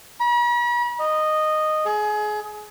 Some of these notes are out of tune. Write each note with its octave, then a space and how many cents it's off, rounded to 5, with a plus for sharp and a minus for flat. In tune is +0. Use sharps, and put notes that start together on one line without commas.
B5 -45
D#5 -10
G#4 +25